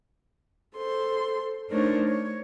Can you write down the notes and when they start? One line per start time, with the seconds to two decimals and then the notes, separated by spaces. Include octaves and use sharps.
0.75 A4 C5 C6
1.70 A3 D4 D#4 A#4 C5 C#5
2.08 C#5